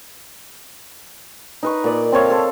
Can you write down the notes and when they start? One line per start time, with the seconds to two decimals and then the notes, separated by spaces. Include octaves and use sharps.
1.63 D#4 B4 C#6
1.84 A#2 D5
2.12 C4 A4 C#5 F5
2.30 A4 C5